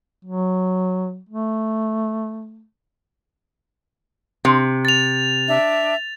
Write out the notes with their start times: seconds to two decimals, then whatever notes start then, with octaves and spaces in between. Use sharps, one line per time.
0.25 F#3
1.29 A3
4.45 C3
4.85 A6 F7
5.47 D4 E5